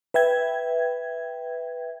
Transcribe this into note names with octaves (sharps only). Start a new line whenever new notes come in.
B4 E5 G5 G#6